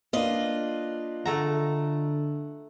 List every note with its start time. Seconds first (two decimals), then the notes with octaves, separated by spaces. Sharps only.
0.13 A#3 D4 F4 B4 D#5
1.25 D3 A3 A4 F#5 A#5